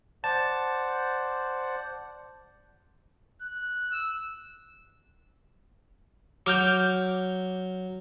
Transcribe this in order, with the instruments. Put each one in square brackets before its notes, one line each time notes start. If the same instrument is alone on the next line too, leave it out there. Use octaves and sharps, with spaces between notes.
[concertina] C5 D5 F#5 [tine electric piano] A5
[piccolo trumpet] F#6
E6
[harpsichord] F#3 [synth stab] D6 F6 G6